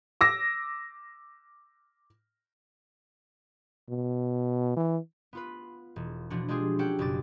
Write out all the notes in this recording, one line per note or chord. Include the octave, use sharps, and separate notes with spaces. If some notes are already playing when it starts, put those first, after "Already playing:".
D6 E6 A#6
B2
E3
B3 F4 B4
E1
B2 E3 F3 D4 F#4
G#3 D4 F4 G4 G#4
C#4 G4 A4 F#5 G5
F#1 F#2 B2 F#3 D6 A6